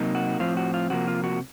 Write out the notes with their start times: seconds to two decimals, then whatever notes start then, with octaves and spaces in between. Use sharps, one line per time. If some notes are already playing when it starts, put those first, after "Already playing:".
Already playing: C3 F#3 A#3 D#4
0.15 F#4
0.39 A2 F3 C4 F4
0.57 F#4
0.74 F4
0.90 C3 F3 A#3 F#4
1.08 F4
1.24 F#4